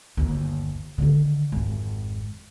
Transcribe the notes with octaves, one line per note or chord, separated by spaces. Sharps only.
G1 D#2
D3 D#3
G#1 F2